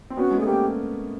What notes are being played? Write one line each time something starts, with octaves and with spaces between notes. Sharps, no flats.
C4
B3 C#4 F#4
G#3
A3 G#4
A#3 G4